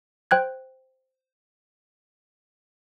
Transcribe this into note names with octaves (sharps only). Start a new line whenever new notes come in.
C5 G5 F#6 G#6